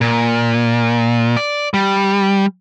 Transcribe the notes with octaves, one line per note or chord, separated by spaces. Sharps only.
A#2
D5
G3